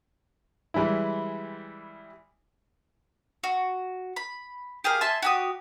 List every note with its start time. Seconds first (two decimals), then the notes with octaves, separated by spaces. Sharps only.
0.74 E3 G3 G#3 E4
3.44 F#4
4.16 B5
4.84 G4 G#4 A#4 F5
5.01 E5 G#5 A5 C6
5.22 F#4 G4 D#6